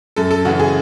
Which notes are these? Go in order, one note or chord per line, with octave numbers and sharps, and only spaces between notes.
F#2 A4
A4
C#3 E3 F#4
G#4